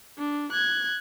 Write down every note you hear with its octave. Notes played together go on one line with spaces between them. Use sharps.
D4
F#6 G#6